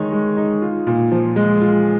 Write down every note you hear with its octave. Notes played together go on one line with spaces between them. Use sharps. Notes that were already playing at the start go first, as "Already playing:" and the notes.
Already playing: D#3 G#3 D#4 C#5
G#3
D#4
F4
A#2
F3
G#3
F4